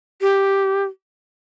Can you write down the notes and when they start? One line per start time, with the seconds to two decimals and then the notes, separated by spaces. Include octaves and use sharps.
0.21 G4